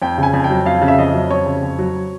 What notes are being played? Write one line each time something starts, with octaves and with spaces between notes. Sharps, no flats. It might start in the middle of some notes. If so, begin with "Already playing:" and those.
F2 G5
C#3 G#5
F2
G5
F#3
F2 F5
C#3
E5
F2 D#5
F#3
F2 C#5
C#3
F2
F#3